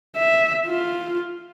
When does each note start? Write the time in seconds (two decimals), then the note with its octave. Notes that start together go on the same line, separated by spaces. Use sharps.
0.17 E5
0.67 F4